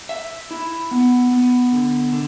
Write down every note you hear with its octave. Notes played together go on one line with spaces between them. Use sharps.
E5
E4
B3
B3
D3
D3